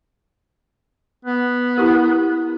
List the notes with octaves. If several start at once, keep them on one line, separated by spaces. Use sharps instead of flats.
B3
E4 G4 A#4